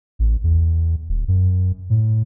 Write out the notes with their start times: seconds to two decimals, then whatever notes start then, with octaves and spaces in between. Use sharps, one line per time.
0.19 A1
0.44 E2
1.09 D#1
1.28 F#2
1.90 A2